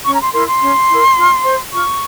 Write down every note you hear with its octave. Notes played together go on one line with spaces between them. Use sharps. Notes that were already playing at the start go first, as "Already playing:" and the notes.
C#4 C#6
A#5
C6
E4 A#4 C6
C6
C#4
E4 A#4
F4
C5
F4 C#6